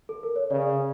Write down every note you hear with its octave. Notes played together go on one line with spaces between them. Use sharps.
A4
A#4
C#5
C#3 D5